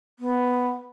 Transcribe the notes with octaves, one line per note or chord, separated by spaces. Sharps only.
B3